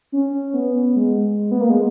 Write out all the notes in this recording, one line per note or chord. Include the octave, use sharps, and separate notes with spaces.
C#4
B3
G#3
B3
A#3
G#3